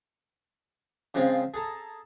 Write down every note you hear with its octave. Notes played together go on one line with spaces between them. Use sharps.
C#3 F3 G#3 C4 C#4 F4
G#4 A4 A#5